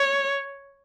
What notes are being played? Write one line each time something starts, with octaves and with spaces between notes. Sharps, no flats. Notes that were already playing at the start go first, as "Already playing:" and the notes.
Already playing: C#5